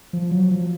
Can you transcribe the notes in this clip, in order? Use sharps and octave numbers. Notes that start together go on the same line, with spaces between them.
F3
F#3
F3